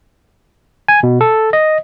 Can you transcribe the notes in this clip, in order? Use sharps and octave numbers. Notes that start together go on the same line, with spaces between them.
G#5
B2
A4
D#5